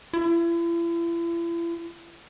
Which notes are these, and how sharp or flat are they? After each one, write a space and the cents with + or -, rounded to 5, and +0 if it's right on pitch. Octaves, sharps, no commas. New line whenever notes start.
E4 +40